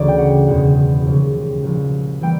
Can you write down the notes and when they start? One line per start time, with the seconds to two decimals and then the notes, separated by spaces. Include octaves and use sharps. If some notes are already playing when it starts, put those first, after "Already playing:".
Already playing: D2 C#3 E3 D5
0.08 G5
0.18 F#5
0.47 F#1 E2 B2 G#3 F#5
1.05 D#2 C#3 F3 G#3
1.63 C2 A#2 F3
2.21 E3 G3 A#3 G5